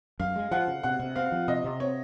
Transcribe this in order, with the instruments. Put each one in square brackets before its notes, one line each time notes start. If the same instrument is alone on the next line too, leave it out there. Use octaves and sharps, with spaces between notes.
[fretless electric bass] F#2 [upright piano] F5
[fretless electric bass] G#3
[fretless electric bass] F3 [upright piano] F#5
[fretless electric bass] C#3
[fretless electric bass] C3 [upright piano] F#5
[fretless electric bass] C3
[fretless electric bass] C4 [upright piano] F5
[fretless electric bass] F3
[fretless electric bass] C3 [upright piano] D#5
[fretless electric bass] C3
[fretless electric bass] C4 [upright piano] C#5